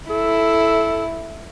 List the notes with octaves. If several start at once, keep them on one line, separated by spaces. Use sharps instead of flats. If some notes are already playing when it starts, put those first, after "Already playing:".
E4 A4